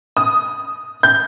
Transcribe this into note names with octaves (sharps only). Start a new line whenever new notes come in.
D#6
G6